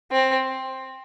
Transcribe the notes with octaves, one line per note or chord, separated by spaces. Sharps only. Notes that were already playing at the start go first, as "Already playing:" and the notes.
C4